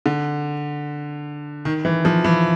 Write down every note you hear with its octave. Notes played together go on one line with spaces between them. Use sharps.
D3
D#3
E3
F3
E3